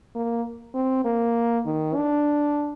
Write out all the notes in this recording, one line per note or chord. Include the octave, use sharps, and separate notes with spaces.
A#3
C4
A#3
D#3
D4